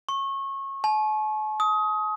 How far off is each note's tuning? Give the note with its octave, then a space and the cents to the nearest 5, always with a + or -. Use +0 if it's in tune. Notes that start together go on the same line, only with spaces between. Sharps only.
C#6 -25
A5 -45
D#6 +25